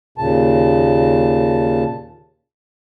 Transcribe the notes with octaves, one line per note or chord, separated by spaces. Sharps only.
D#2 A#2 C#3 A5